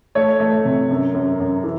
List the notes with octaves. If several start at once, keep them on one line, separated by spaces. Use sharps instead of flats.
A3 C#5
A3
C3
F#2
F#2
F#2
E3